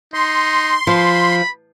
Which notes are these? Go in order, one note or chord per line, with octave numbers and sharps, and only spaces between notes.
D#4 C6
F3 B5